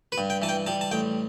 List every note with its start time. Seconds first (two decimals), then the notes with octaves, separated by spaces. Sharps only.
0.12 B4
0.18 G2
0.30 G5
0.42 E3 A5
0.49 G5
0.66 G3 A5
0.81 A5
0.91 A1 G5